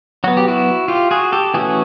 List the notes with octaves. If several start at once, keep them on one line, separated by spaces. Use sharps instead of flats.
F#3 B3 F#4
G4
E4 F#4
F4 G4
F#4 G#4
G4 A4
E3 A3 C#4 F#4 G#4